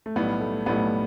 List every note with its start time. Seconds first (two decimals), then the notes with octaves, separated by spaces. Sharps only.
0.06 A3
0.16 B1 A2 G3 B3
0.41 A3
0.66 B1 A2 G3 B3